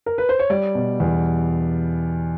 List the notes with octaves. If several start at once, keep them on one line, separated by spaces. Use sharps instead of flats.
A#4
B4
C5
C#5
G3 D5
B2
E2